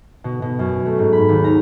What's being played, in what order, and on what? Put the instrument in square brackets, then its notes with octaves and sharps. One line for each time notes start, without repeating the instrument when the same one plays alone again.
[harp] B2
B2
F#2
A3
G#2
B5
D#2
A#5